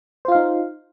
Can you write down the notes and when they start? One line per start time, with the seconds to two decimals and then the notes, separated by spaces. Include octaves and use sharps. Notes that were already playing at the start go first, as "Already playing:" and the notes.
0.25 C5
0.28 F4
0.32 F5
0.35 D#4